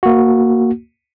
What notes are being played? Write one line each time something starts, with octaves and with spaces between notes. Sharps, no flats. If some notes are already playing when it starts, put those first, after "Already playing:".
A#3 F#4